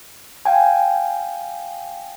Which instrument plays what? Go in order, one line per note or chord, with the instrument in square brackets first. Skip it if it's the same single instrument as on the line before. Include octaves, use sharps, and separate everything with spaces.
[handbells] F5 G5 G#5